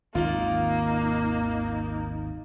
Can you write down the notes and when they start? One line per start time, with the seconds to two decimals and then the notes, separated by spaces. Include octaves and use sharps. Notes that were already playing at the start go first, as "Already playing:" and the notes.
0.15 G#1 D#2 D#3 A#3 D#4 F4